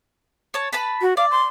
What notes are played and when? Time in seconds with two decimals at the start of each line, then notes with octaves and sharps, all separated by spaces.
0.54 C#5 A5
0.73 B4 A5 B5
1.01 F#4
1.17 D5 F5
1.31 C6